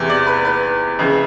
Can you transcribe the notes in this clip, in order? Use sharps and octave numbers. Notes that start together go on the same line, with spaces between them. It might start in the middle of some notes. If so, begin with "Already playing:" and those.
Already playing: E2 C3 E3
D5
B4
B4
F2 C#3 E3